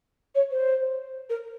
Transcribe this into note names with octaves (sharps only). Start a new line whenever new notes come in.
C#5
C5
A#4